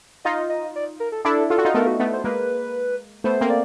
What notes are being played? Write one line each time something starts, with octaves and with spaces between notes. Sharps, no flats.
D#4 F4 D#5
D#5
D5
A#4
A4
D4 E4 A4
F4 A4
F#4
D#4 F4
A3 B3 A#4
F#4
A3 B3
C5
G#3 A#3 B4
A3 B3 C5
A#3 C4
D5